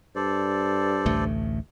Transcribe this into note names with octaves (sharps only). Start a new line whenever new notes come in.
G2 A4 C5 D5
A1 D2 A3